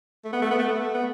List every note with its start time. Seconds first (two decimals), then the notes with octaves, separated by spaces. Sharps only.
0.24 A3
0.33 B3
0.42 A3
0.51 B3
0.59 A3
0.68 B3
0.75 A3
0.94 B3